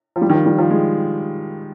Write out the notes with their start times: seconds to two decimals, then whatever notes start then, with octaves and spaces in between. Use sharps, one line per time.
0.16 F3
0.22 G3
0.30 D#3
0.34 F3
0.46 G3
0.58 F3
0.70 G#3